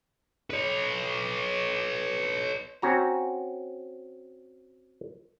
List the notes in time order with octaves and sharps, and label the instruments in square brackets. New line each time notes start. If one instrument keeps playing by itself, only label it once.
[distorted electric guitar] B4 C#5
[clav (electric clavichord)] C4 C#4 F#4 A#5